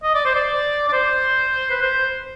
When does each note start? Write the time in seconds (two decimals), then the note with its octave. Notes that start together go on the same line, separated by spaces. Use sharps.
0.03 D#5
0.14 D5
0.25 C5
0.35 D5
0.88 D5
0.93 C5
1.70 B4
1.82 C5